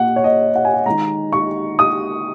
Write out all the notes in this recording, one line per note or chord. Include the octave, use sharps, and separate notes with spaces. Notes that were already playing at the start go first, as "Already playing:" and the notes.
Already playing: A#2 A#3 F#5
C#5
D#5
F#5
G#5
F#5
D#3 G#3 A#5
C#6
D#6